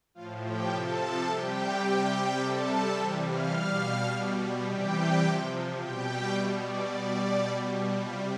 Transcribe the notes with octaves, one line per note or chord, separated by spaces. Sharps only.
A2 F3 F4 F5
G4 G5
C3 F3 A4 A5
C3 G3 G4 G5
C3 G3 G4 G5
C3 G3 A4 A5
C3 E3 G3 E5 E6
F5 F6
B2 G3
B2 G3
C3 E3 G3 G4 G5
C3 F3 G4 G5
B2 G3 G4 G5
B2 G3 E5
D5
B2 G3 D5
B2 G3
C3 G3 F4 F5